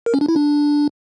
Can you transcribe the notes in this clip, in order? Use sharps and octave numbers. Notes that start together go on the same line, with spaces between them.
A#4
C#4
D4
E4
D4